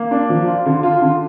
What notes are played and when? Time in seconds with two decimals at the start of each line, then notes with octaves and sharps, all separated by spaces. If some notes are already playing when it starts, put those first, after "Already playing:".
Already playing: A#3
0.11 D4
0.29 F3
0.47 F4
0.66 D3
0.83 F4
1.01 D3